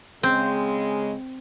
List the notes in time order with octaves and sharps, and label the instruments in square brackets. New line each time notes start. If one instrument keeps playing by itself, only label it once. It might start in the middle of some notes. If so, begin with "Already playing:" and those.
[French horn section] C#3 G#3 [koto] C4